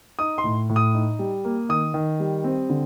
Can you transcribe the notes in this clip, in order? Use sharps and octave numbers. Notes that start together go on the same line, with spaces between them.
D#4 D#6
C6
A2
A2
D#6
D#4
G3
A#3
D#3 D#6
D#3
G3
C4
D3